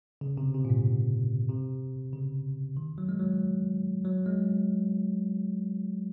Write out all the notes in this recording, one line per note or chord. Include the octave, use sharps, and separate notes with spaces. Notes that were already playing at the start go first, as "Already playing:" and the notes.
C#3
C3
C3
A#2
G#2
C3
C#3
D#3
F#3
G#3
F#3
F#3
G#3